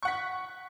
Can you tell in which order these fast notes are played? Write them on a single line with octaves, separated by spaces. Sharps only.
C#6 F#5 B6